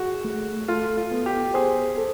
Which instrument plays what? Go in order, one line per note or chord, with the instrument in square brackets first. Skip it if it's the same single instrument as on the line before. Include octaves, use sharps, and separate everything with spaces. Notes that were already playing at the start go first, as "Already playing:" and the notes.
Already playing: [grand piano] F#4 [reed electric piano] G#4
[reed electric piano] A3
[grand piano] F4 [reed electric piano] A4
[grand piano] F4
[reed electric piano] B3
[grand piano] G4
[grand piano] G#4 [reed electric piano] C5
[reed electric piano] A4